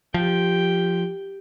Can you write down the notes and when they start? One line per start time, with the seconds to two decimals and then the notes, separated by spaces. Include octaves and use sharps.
0.14 F3 G4 G5